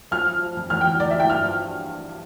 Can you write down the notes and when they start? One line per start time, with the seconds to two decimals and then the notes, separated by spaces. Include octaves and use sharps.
0.11 F3 F6
0.27 F3
0.42 F3
0.57 F2
0.70 E2 F6
0.81 G5
0.85 E2
1.00 E2 D5
1.11 E5
1.15 E3 G5
1.30 G2 F6
1.44 F3